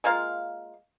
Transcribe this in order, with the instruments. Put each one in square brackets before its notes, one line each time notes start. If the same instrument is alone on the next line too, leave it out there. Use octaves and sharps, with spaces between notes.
[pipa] G#3 A#3 F4 F5